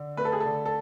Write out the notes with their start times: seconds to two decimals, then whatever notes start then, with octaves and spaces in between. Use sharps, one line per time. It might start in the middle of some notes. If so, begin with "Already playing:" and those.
Already playing: D3
0.17 A3 B4
0.25 A4
0.33 G#4
0.40 A4
0.45 D3
0.65 A4